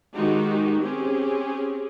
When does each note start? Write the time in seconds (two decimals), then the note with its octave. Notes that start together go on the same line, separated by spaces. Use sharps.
0.14 D#3 G#3 D#4 F#4 G4
0.83 C4 C#4 G4 G#4